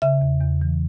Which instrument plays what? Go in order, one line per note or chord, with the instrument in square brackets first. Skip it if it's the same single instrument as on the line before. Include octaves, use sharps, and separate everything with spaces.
[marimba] C#3 E5
E2
E2
E3